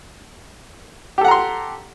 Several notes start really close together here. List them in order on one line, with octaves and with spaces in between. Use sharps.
G4 A4 F#5 A#5 C6